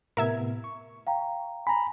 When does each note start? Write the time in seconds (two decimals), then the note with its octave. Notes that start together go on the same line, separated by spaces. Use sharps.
0.17 A2 C3 B3 A#4 E5 G#6
0.64 C#6
1.07 F5 G5 A#5
1.67 G#5 A#5 B5